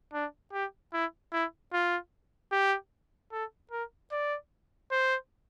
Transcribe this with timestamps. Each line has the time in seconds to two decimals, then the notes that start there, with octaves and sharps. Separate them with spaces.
0.14 D4
0.53 G4
0.93 E4
1.33 E4
1.73 F4
2.52 G4
3.32 A4
3.71 A#4
4.12 D5
4.92 C5